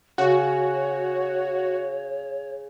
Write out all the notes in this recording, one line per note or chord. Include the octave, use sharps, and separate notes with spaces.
C#3 F#4 C#5